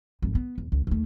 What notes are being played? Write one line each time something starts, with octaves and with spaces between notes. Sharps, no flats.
G#1 F2
B3
E2
C#2
D#2 A3